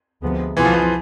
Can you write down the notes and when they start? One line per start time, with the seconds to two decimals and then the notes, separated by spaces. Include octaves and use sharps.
0.22 D2 C3 F3 G#3 B3
0.57 C2 B2 E3 B3 F4 G#4
0.65 F3
0.73 E3
0.83 F3